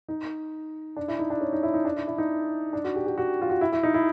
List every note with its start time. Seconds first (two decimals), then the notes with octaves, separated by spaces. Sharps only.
0.08 D#4
0.97 D4
1.08 E4
1.19 D#4
1.30 D4
1.41 C#4
1.53 D#4
1.63 E4
1.74 D#4
1.85 D4
1.96 E4
2.07 E4
2.18 D#4
2.73 D4
2.84 F#4
2.96 G4
3.07 G4
3.18 F#4
3.42 F4
3.50 F#4
3.61 E4
3.72 E4
3.83 D#4
3.94 E4